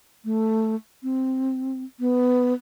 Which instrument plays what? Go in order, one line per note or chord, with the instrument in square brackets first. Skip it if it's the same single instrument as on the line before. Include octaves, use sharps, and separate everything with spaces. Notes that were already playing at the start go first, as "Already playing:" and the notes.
[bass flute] A3
C4
B3